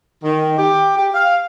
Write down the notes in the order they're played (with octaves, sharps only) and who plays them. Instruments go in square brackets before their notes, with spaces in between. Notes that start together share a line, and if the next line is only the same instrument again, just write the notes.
[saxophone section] D#3
G4
G4
F5